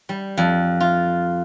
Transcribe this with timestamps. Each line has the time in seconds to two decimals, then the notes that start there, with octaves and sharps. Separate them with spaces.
0.09 G3
0.37 F2
0.80 F4